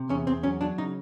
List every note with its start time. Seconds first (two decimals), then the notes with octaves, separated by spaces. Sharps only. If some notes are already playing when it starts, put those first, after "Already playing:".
Already playing: C3
0.09 E2 C#4
0.27 E2 C4
0.43 F#3 C#4
0.61 F#3 D4
0.78 C#3 D#4